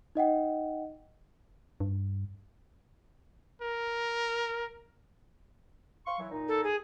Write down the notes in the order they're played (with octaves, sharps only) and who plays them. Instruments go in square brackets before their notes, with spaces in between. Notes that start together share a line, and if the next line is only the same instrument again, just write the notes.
[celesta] D#4 D#5 F#5 G5
[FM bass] G2
[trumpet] A#4
[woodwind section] F5 C6 C#6
E3 F#3
A#2 D#4
[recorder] A4
G#4